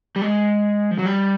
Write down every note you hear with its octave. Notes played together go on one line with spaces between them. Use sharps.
G3
G#3
F3
F#3
G3